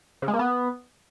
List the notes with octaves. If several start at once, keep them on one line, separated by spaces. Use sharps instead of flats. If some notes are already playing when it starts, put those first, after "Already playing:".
C#3
G#3
A#3
B3